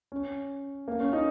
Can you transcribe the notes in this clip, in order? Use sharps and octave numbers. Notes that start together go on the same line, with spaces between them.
C#4
A#3
C#4
D#4